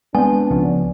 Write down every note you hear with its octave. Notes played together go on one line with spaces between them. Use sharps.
G#3 B3 C4 D4 G#5
C#2 F3 C#4